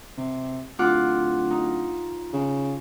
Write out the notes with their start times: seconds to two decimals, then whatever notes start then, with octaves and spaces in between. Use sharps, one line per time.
0.18 C3
0.79 D1 F4 F#5 D6
1.50 D#4
2.33 C#3